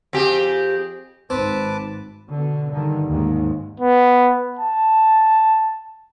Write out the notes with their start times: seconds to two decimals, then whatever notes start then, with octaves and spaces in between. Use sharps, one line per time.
0.13 F2 G4 G#4
1.30 G#1 C4 B4 A5 D6
2.27 B2 D3
2.71 G2 D3 D#3
3.08 D#2 G#2
3.80 B3
4.59 A5